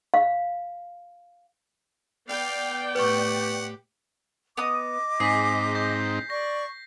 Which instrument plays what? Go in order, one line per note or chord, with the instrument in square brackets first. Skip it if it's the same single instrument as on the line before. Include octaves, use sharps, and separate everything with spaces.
[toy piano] F5
[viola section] B3 D5 G5 [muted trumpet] F5
[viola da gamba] A2 G4 [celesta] B4 C#6 [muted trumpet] F#5
[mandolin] B3 D#6 [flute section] D#5 D6
[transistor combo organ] G#2 C4 D#4 [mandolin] G#4 [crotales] B6 C7
[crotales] G6 A#6
[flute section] D5 C#6 [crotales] A#6